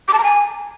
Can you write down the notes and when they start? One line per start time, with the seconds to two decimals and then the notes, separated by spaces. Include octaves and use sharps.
0.08 D6
0.13 A5
0.19 A#5
0.24 G#5